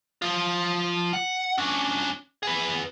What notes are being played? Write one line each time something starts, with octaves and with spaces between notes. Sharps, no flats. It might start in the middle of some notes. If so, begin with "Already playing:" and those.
F3 F4
F#5
C#4 D4
G#4 B4